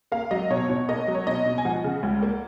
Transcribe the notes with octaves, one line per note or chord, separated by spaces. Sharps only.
A#3 F5
F#3 D#5
B2 C#5
B2 C#5
A#3 D#5
F#3
C#5
B2 D#5
B2
G#5
F3 F#5
C#3
C#2
A#3